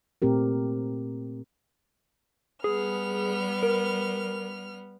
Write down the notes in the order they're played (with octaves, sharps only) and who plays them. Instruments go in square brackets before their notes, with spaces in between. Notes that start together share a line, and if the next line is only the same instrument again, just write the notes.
[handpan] A#2 A3 C4 G4 A#4
[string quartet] G3 B3 F6 [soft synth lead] G#4
[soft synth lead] A#4